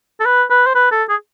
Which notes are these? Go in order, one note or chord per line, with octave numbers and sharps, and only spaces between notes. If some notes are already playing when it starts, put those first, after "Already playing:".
A4
B4
B4
C5
B4
A4
G#4